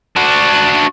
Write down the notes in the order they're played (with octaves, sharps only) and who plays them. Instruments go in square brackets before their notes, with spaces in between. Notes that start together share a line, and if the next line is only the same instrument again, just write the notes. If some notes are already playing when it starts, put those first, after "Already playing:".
[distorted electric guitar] D4 F#4